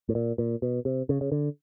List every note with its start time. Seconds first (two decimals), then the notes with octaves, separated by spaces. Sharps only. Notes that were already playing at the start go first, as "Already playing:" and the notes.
0.09 A2
0.15 A#2
0.38 A#2
0.62 B2
0.85 C3
1.09 C#3
1.21 C#3
1.32 D3